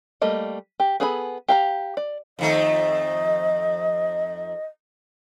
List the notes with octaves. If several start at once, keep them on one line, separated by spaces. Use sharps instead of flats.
G3 A3 A#3 D#5
G4
B3 G#4 A4 G#5 B5
G4 F5 A#5
D5
F2 D#3 A3 D#5